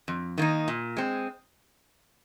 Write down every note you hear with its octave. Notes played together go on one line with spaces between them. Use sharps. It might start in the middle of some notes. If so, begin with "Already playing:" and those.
F2
D#3 A#3 D#4
A#2
G#3 C4